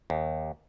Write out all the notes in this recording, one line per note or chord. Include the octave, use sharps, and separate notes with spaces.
D#2